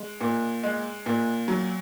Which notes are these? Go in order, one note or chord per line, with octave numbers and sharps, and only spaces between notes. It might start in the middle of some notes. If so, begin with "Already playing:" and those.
Already playing: G#3
A#2
G#3
A#2
F#3